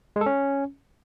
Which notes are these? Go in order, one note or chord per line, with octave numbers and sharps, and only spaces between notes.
G#3
A4
C#4